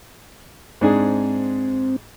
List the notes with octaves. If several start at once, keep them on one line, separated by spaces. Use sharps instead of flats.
G#2 C4 D4 G#4